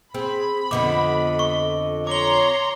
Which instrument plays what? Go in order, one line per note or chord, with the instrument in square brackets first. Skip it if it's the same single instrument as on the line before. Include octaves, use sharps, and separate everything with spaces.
[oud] C4 [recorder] G#4 [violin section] B5
[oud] F2 D3 B3 [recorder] D#5 [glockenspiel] D6
[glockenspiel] C#6
[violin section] C#5 A#5 C6 [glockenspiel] D6 G7